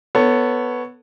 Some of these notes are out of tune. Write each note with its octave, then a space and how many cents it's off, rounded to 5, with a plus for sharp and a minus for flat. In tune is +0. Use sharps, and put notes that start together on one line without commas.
B3 +0 A4 +25 C#5 +0